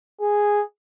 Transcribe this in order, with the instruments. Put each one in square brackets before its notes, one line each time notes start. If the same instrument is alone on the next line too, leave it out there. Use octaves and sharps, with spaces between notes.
[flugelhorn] G#4